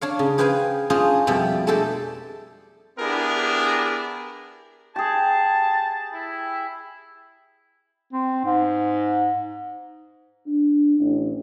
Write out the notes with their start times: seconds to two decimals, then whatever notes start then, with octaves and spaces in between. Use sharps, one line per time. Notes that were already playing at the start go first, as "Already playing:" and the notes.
0.01 D4 C#5 F5
0.19 C#3
0.38 G#4 B4 C5 F5 G5 G#5
0.90 C#4 D4 F4 G#4 C5 D#5
1.27 F2 B2 G3 D5 E5
1.67 G#3 A3 D4 A4 E5 G5
2.99 B3 D4 E4 G4 G#4 A#4
4.96 G4 G#4 A5
6.13 E4
8.13 C4
8.45 G#2
10.47 D4
10.99 A1